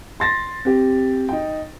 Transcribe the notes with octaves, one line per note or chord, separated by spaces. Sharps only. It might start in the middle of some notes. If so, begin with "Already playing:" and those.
C6 A6 A#6
C4 G4
D#4 G5